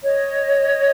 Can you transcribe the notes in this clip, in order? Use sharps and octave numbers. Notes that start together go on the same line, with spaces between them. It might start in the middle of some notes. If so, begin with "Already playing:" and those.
C#5 D#5